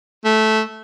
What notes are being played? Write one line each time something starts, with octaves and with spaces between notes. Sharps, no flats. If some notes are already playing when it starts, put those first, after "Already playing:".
A3